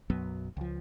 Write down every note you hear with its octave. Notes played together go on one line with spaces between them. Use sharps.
B1 F#2 F#3 B3
C#2 F3